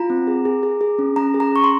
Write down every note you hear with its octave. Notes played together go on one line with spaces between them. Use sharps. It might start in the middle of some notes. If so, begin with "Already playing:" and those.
Already playing: F4 A#5
C4
G#4
G#4
G#4
G#4
C#4
C#4 A#5
G#4
A#5
C#4 C#6
C6